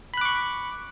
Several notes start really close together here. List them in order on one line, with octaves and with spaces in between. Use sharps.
B5 F#6 D6 C#6